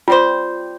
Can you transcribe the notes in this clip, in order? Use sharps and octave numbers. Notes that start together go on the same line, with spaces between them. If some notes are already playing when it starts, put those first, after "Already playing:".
G3 C4 F4 G4 C5